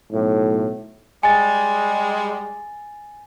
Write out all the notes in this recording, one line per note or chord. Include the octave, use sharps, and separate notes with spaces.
B1 A2
G3 G#3 G#5 A6